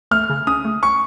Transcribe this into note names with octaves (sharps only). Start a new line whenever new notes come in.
A3 F6
C#3
C#4 D#6
A3
C#4 C#6